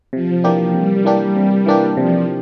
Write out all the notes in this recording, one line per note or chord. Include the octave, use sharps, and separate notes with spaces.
C3 F3
E3 A#3 D4 G4
C3 G3
E3 A#3 D4 G4
C3
E3 A#3 D4 G4
C3 F3